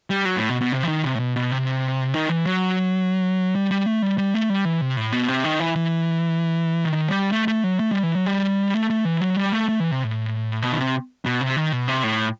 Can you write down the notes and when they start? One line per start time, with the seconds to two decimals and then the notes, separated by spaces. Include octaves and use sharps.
0.10 G3
0.25 F#3
0.37 A2
0.49 B2
0.61 B2
0.72 C3
0.83 E3
0.88 D#3
1.04 C3
1.15 A2
1.20 B2
1.36 B2
1.51 C3
2.14 D#3
2.29 E3
2.45 F#3
3.55 G3
3.71 G3
3.86 A3
4.02 G3
4.18 G3
4.34 A3
4.50 G3
4.65 E3
4.81 C3
4.97 A2
5.12 B2
5.28 C3
5.44 D#3
5.60 E3
5.76 E3
6.85 D#3
7.08 G3
7.32 A3
7.48 A3
7.64 F#3
7.80 A3
7.91 G3
8.03 E3
8.15 F#3
8.26 G3
8.74 A3
8.90 A3
9.05 E3
9.21 F#3
9.37 G3
9.52 A3
9.69 A3
9.80 E3
9.91 C3
10.04 A2
10.62 B2
10.72 D#3
10.78 C3
11.25 B2
11.41 C3
11.56 D#3
11.72 B2
11.88 C3
12.03 A2